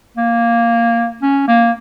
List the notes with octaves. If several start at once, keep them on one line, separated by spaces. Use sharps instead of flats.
A#3
C#4
A#3